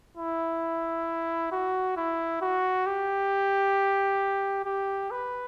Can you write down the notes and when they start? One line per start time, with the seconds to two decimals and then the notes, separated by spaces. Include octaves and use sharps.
0.17 E4
1.52 F#4
1.97 E4
2.42 F#4
2.86 G4
4.65 G4
5.11 B4